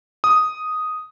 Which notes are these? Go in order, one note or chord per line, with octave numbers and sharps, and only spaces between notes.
D#6